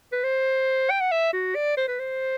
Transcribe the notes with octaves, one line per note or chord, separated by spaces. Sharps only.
B4
C5
G5
F#5
E5
F#4
D5
C5
B4
C5